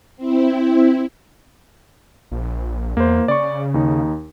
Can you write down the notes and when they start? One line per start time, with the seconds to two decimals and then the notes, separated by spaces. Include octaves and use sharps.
0.17 C4 E4
2.31 A#1
2.97 E2 A#3 C5
3.28 C#3 D5 C#6
3.74 D#2 D#4